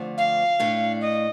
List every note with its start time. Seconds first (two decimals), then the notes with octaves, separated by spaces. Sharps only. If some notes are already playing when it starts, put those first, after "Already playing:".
Already playing: F2 D3 F3 A3
0.18 F5
0.60 A2 A3 D4
1.01 D#5